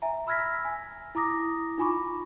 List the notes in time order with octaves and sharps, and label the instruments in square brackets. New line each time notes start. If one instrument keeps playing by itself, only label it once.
[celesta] E5 G#5 A#5
B5 E6 F6 G#6 A#6 B6
G#5
E4 A#5 D6 D#6 A#6
D#4 F4 G#5 B5 C#6 D6